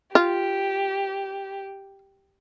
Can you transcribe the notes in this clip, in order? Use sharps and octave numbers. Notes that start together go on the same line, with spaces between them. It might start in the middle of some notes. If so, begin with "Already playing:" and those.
F4 G4